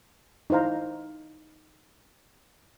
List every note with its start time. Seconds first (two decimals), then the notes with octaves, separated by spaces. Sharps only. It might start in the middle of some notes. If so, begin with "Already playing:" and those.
0.50 D#4 E4 C5 F5 A#5